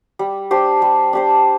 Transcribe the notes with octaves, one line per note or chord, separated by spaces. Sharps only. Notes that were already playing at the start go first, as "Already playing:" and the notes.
G3
D4 G4 C5
G3
D4 G4 C5